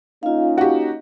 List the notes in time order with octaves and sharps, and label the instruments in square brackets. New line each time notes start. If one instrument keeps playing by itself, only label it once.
[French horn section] A#3 C#4 D#4 [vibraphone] F4 F5
[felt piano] F#4 G4